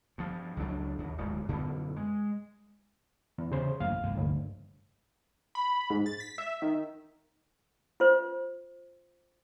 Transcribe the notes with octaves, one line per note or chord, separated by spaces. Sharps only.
G2 F3
C#2 F#3 B3 D4
D#2
D1 G#2
F#2 B2 D3
G#3
E2
C#3 C5
A1 F#2 A#3 F5
F1 G2 A#3
D2
B5
G#2
A6
B6
E5
D#3
F4 C5